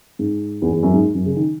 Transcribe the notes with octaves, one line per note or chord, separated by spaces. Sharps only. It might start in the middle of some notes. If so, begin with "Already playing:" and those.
G#2
E2
E2
F#2
G#2
F#2
C#3
D#3